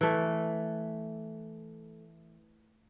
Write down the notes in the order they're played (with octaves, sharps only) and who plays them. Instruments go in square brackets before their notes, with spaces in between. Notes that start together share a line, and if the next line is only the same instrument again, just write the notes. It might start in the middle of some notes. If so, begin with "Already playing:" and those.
[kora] E3 A3